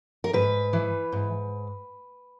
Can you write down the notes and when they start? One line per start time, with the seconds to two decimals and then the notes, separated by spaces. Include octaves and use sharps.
0.24 A#4
0.33 G#2 B4
0.73 E3
1.12 G#2